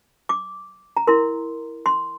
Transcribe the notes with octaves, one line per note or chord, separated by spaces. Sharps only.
D6
A#5
E4 A#4 C6
C6